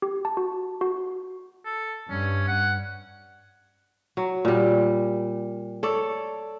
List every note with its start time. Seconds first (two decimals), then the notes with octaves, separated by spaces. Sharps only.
0.02 G4
0.25 A5
0.37 F#4
0.81 F#4
1.65 A4
2.10 G2 C#4
2.48 F#5
4.17 F#3
4.45 A#2 G3
5.83 A4 C#5 D5